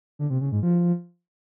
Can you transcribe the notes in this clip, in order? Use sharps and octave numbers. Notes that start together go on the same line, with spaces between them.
D3
C3
C#3
G#2
F3